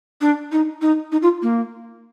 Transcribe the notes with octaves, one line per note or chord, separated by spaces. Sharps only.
D4
D#4
D#4
D#4
F4
A#3